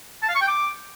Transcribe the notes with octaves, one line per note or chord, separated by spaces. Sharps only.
A5
F5
C#6
G5
D6